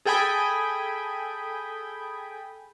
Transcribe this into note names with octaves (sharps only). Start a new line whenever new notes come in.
G#4 A4 G5 G#5 B5 D#6